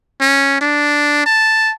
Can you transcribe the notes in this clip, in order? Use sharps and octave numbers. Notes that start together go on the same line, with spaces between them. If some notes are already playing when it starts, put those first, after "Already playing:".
C#4
D4
A5